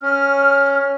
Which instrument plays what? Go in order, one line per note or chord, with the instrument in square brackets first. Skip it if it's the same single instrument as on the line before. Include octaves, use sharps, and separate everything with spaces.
[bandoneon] C#4 [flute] F6